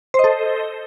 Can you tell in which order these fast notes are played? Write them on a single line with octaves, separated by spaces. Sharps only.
C5 D#5 A4